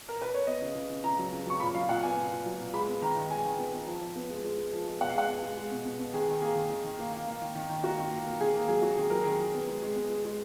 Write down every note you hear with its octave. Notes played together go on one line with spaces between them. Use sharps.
A#4
B4
C#5
B3 D#5
C#3
C#3
C#3
C#3 A#5
F#3
C#3
F#3 C#6
A#2 B5
F#3 F5
A#2 F#5
B3 G#5
A#2
A#2
F#3
A#2
G#3 B5
B3
D#3 A#5
D#3
G#3 G#5
D#3
B3
B3
F3
F3
B3
G#3
G#3
G#3
F3
G#3
B2 F#5
F5
G#3 F#5
B3
G#3
G#3
B2
B2
B2
D#3 G#4
D#3
A#3 G#4
D#3
D#3
D#3
A#3
A#3
A#3
D#3
D#3
D#3
A#3 F#4
D#3
A#3
A#3
D#3 G#4
A#3
F#3 G#4
F#3 F#4
D#3 G#4
F#3 A#4
D#3 G#4
F#3
B3
G#3
G#3
B3
G#3
G#3